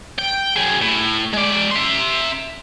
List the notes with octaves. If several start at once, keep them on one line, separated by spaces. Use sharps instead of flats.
G5
F#3 G#4
A2
G#3 D5
E5 C6